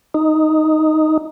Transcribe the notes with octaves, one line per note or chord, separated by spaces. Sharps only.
D#4